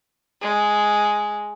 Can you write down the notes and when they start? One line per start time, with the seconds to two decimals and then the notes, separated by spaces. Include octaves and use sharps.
0.42 G#3